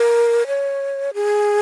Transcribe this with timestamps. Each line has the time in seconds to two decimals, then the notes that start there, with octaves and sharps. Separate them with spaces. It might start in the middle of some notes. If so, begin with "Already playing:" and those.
Already playing: A#4
0.47 C#5
1.14 G#4